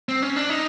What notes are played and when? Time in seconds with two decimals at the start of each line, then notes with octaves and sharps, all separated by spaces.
0.09 C4
0.22 C#4
0.36 D4
0.50 D#4